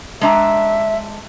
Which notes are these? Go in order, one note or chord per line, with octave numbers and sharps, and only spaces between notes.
G#3 D4 E5 A#5